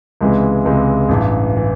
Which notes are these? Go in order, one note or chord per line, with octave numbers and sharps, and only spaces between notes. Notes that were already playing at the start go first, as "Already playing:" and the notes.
C#2 C3 E3 G#3
C#2 C3 E3 G#3
A1 G2 E3
E3